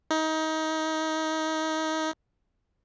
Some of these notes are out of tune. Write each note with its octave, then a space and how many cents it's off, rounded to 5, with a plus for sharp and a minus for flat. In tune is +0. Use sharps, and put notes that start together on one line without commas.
D#4 +25